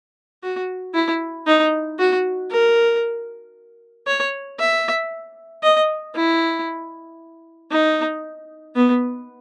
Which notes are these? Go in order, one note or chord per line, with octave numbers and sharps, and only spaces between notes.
F#4
E4
D#4
F#4
A#4
C#5
E5
D#5
E4
D#4
B3